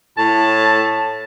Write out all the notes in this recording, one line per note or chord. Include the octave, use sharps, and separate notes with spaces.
A2 A5